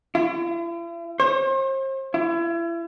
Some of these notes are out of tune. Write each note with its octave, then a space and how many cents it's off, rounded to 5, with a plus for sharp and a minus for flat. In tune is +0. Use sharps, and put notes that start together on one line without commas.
E4 +45
C5 +40
E4 +35